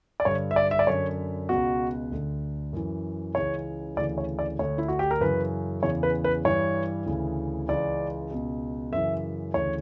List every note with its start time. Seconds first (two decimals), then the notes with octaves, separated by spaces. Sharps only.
0.20 D5
0.25 G2 D3 C#5
0.51 E5
0.56 D5
0.71 E5
0.79 D5
0.87 F#2 D3 C#5
1.49 C#2 B2 F#4
2.11 D2 D3
2.73 F#2 E3
3.35 C#2 C#3 E3 C#5
3.97 D2 C#3 E3 D5
4.18 C#5
4.39 D5
4.59 D2 D3 C#5
4.78 E4
4.88 F#4
4.99 G4
5.11 A#4
5.21 F#2 C#3 E3 B4
5.83 E2 C#3 E3 C#5
6.03 B4
6.24 B4
6.45 G2 E3 C#5
7.06 D2 C#3 E3
7.68 C#2 C#3 E3 D5
8.30 C#2 B2
8.93 F#2 C#3 E3 E5
9.54 D2 C#3 E3 C#5